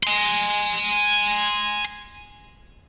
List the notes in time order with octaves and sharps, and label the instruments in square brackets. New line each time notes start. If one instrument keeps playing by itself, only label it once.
[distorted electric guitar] G#5 C6